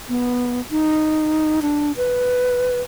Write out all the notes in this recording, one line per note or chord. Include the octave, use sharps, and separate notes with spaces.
B3
D#4
D4
B4